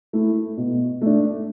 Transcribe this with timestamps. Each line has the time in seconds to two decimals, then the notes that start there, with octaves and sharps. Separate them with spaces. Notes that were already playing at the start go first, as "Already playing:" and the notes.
0.13 A3 E4
0.57 B2
1.02 A3 D4